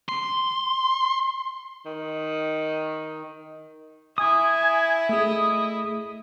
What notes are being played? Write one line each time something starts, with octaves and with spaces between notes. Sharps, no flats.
C6
D#3
E4 G#5 D#6
A3 G#4 D#5